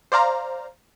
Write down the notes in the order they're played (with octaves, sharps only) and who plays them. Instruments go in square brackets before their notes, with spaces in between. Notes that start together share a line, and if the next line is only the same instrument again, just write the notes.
[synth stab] C5 D5 F5 A#5